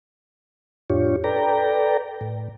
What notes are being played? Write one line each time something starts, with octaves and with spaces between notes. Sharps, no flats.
F2 A2 D4 F4 G4 C#5
A4 B4 D5 G5 A#5
A2